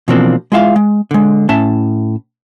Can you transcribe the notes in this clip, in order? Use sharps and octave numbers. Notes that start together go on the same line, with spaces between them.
B2 E3 F3 A#3 C4 D4
G#3 E4 F4 E5 F5
G#3
D3 G#3
A2 C#4 E5 A5